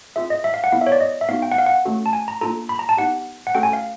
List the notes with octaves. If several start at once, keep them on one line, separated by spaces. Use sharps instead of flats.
C4 F4 G#4 E5
D#5
E5
F5
F#5
B3 E4 A4 F5
E5
C#5
D5
D#5
E5
B3 D#4 F#4 F5
G5
F#5
F5
F#5
A3 C#4 F#4 A4
A5
G#5
A#5
A#3 D4 F4 A4 A#5
B5
A#5
A5
B3 D#4 G4 F#5
F#5
A3 C#4 F#4 A4 G5
G#5
F5